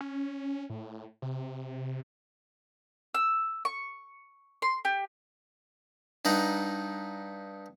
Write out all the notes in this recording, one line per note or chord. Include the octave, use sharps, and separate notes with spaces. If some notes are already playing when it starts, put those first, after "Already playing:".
C#4
A2
C3
E6
C#6
C6
G4
G2 D#4 F#5 A#5